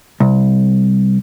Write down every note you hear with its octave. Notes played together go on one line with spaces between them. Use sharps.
C2